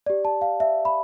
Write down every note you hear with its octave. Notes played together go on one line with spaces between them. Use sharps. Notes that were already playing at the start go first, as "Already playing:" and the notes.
G4 D5
A5
F5
E5
B5